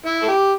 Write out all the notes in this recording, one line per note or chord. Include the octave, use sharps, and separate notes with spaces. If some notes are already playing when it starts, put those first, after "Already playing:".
E4
A4
G4